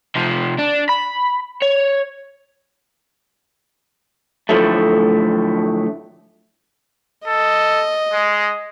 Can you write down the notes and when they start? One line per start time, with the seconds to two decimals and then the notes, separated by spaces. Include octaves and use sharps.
0.15 C3 F3
0.58 D4
0.89 B5
1.62 C#5
4.49 A2 D3 F3 F#3 A3
7.27 A4 D#5
8.13 G#3